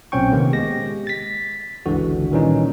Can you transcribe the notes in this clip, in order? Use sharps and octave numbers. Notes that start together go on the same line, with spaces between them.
B1 A#2 C4 C#4 G5 C#6
C3 D#3 A#3 B3
G#3 G4 A#6
A6 B6
G1 C#2 D3 E3 F#4
A#2 D#3 E3 G3 C#4 D#4